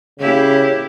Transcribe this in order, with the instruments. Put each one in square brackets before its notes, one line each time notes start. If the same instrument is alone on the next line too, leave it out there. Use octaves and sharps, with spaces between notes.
[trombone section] C#3 [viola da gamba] A#3 E4 G4